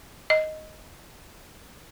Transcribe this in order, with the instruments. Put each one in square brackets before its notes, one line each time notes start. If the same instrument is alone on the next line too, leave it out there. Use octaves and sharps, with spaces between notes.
[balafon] D#5